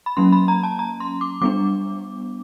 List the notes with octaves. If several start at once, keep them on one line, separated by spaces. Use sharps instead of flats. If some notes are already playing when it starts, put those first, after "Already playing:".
B5
F#3 A#3 C#4 C6
B5
A#5
A5
A#5
C6
D6
G3 B3 D4 D6